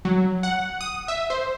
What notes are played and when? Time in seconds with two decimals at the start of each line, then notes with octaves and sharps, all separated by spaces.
0.05 F#3
0.43 F#5
0.81 D#6
1.08 E5
1.30 C5